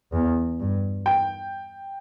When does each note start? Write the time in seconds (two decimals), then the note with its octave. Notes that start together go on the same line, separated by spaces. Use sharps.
0.12 E2
0.59 G2
1.06 G5